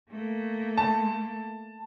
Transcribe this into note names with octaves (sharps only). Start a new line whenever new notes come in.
A3 A#3
A5